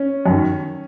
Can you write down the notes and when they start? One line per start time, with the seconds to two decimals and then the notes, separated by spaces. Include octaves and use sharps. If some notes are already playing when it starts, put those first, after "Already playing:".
Already playing: C#4
0.26 F#2 D#3